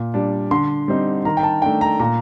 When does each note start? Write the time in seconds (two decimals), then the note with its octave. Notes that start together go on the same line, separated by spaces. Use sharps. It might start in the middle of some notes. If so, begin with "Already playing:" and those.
Already playing: A#2
0.14 G3 D4
0.51 D3 C6
0.88 G3 C4 D#4
1.25 D#3 A#5
1.37 G5
1.43 A5
1.62 A3 D4 G5
1.81 A#5
2.00 A#2 A#5